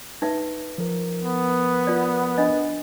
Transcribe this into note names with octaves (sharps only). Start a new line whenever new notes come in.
D#4 B4 E5
F3 A#4
B3
F4 D5
D4 D#5